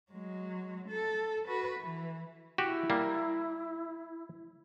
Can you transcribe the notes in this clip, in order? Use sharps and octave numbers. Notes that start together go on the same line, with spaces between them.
F#3 G#3
A4
F#4 B4
E3
E4 F#4 G4
G3 A#3